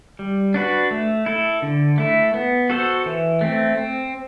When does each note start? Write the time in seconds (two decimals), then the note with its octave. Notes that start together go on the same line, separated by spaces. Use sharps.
0.19 G3
0.54 D4 F#4 B4
0.91 A3
1.26 E4 A4
1.62 D3
1.98 A3 E4
2.34 B3
2.70 F#4 A4 C5
3.06 E3
3.41 A3 C4
3.77 C4